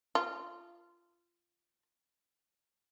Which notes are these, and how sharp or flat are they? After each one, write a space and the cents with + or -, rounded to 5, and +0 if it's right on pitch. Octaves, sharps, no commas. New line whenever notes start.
F4 -15